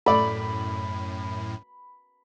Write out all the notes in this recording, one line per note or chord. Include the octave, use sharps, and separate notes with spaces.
F#2 A2 A3 D5 B5